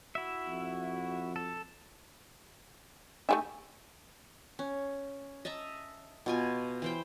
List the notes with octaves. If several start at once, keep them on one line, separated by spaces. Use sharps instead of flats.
E4 F#4 E5
F2
A4
A3 A#3 D#4 G4 E5 G#5
C#4
D#5 E5 A5 A#5
B2 F4 G#5
E3 C5 G5